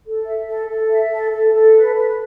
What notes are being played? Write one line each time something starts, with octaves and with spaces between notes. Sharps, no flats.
A4
E5
A4
A4
E5
A4
A4
A4
B4
B4